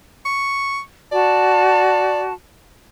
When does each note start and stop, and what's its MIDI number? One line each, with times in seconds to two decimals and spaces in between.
0.25 0.80 85
1.12 2.33 66
1.12 2.22 74
1.12 2.33 81